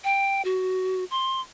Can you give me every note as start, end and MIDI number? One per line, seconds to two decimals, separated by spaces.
0.04 0.42 79
0.45 1.05 66
1.11 1.41 84